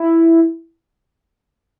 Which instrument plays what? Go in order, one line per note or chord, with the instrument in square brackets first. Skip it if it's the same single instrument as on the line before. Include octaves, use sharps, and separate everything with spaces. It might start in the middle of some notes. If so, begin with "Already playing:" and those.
Already playing: [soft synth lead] E4